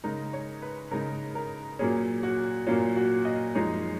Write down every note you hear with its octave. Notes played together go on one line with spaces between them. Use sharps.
C#3 G#3 D#4 A#4
C#5
B4
C#3 G#3 D#4 A#4
A#4
A#2 F#3 A#3 C#4 G#4
F#4
A#2 F#3 A#3 C#4 F4
F#4
D#5
F#2 F3 G#3 D#4 C#5